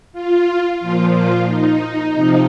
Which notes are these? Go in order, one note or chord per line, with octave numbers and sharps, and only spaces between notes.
F4
A#2 F3 F4
F4
D#4
C3 F3